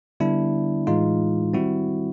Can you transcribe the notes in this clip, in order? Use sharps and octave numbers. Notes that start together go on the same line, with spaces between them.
D3 G3 B3 D4 E4
A2 E3 G#3 D#4 F4
D#3 G3 C4 E4 F#4